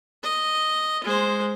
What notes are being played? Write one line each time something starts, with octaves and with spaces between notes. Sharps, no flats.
D#5
G#3 C5